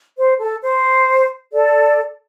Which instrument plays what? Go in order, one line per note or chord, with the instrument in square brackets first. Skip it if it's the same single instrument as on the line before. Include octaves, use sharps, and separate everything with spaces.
[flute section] C5
A4
C5
A4 D5